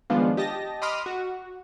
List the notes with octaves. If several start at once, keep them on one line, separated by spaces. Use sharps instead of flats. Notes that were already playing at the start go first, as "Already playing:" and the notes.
D#3 F3 G#3 B3 D4 F4
G4 D#5 A5 A#6
D#5 B5 C6 D6 D#6 F6
F#4